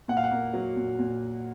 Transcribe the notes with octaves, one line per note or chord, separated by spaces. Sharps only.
A#2 F#5
F5
F#5
A#3
F#3
A#2
A#2